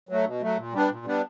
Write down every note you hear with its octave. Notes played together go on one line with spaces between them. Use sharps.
F#3 A3
B2
F#3 A3
A#2
G3 B3 D4
A#2
G3 B3 D4